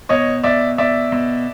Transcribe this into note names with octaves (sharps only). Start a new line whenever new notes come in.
B2 C#5 D#5
B2 D5 E5
B2 D5 E5
B2